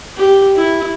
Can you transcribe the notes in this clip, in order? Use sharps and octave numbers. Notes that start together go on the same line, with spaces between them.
G4
E4